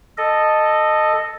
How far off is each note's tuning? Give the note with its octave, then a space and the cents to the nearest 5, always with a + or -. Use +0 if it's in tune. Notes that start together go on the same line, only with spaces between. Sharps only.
A4 +0 D#5 -10